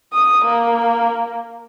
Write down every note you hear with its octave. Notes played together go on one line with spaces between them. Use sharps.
D#6
A#3